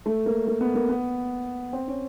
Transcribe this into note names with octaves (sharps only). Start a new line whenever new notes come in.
A3
A#3
A#3
B3
A#3
B3
C4
C#4